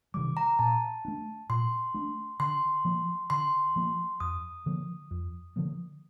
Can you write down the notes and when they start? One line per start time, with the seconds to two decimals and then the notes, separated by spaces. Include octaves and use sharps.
0.14 C3 D#3 G3 D6
0.37 A#5
0.59 A#2 A5
1.05 A3 D4
1.49 A#2 C6
1.94 A3 D4
2.40 D3 C6
2.85 F3 A#3
3.30 D3 C6
3.76 F3 A#3
4.20 F2 D#6
4.66 D3 F3 A#3
5.11 F2
5.56 D3 F3 A#3